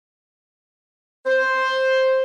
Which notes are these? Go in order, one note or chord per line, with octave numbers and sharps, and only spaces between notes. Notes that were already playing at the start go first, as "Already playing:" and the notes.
C5